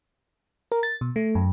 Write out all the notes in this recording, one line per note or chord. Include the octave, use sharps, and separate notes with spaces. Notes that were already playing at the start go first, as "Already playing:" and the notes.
A#4
A6
B2
A3
F#2